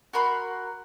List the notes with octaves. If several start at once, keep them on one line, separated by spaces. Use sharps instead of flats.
F#4 A#4 B5 C6